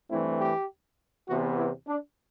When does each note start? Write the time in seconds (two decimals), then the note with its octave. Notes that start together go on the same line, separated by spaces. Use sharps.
0.11 G2 E3 A3 C4 E4
0.40 G4
1.29 E2 C3 E3 B3 F#4
1.58 E4
1.88 D4